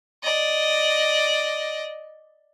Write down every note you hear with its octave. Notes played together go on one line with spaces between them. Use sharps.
D5 D#5